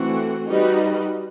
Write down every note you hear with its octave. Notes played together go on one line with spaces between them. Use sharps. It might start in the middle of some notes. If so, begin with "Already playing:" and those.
Already playing: E3 A3 C4 F#4
G3 D#4 F#4 B4